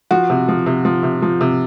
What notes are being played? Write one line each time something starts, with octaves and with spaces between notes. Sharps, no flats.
F3 F#4
C3
F3
C3
F3
C3
F3
C3